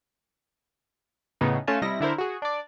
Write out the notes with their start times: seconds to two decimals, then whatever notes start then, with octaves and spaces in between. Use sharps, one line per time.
1.41 A2 C#3 B3 D#4
1.68 A3 C#4 F4 F5 G#5 A5
1.82 C3 G3 E4 D#5 A#6
2.01 D3 E4 A#4 C5
2.18 F#4 G#4
2.42 D4 D5